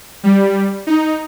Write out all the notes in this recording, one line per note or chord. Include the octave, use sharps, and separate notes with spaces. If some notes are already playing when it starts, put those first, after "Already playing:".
G3
D#4